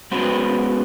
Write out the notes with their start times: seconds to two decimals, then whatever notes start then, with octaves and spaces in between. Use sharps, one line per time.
0.11 G#3 B3 C#4 F#4 B4 C5